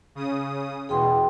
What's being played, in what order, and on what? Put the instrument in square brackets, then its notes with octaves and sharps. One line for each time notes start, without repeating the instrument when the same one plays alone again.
[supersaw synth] C#3 D#6
[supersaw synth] E2 B2 [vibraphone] G#4 G5 C6